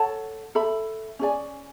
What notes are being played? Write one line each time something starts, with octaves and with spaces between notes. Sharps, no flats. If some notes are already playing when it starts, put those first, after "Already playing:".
Already playing: A4 C#5 F#5 A5
A4 E5 B5
C#4 G#4 D5 G#5